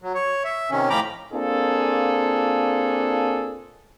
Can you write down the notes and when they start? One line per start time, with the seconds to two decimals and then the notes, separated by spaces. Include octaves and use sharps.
0.02 F#3
0.15 C#5
0.44 E5
0.71 C3 D#3 C#4
0.90 A2 F3 G5 A#5 B5 D6
1.33 A#3 C4 D4 F4 G#4 A4